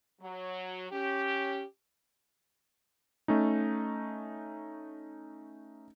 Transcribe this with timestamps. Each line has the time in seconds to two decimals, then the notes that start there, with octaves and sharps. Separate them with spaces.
0.21 F#3
0.92 C#4 G4
3.28 A3 C#4 D#4